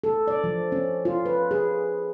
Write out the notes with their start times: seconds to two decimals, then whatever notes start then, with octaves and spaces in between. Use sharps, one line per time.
0.04 A4
0.28 D5
0.44 F3
0.72 C#4
1.05 F4
1.26 B4
1.51 G#4